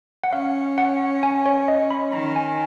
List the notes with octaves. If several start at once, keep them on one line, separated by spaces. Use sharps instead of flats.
F#5
C#4 F5
F#5
G#5
C#5
D#5
B5
D#3 A#5
G#5